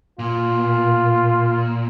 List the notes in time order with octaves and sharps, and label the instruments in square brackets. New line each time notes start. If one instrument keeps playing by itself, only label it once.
[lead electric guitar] A#2 [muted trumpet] F4